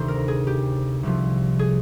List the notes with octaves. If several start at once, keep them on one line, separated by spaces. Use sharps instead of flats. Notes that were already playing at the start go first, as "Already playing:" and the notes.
Already playing: D2 C3 D#3 C5
A#4
G#4
G4
C2 C3 F3
G#4